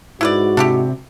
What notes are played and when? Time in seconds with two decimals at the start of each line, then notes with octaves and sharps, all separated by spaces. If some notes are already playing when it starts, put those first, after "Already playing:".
0.21 G#2 E4 F#4 B4 D5
0.57 C3 D4 E4 G4